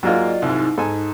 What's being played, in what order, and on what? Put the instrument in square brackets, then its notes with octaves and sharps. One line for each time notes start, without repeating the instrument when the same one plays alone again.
[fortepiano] G#2 A#3 [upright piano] F#3 F4 [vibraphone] D5 D#5
[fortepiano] C2 G#2 [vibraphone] D#4 E4
[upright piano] G#2 [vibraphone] D#4 [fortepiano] A4 G#5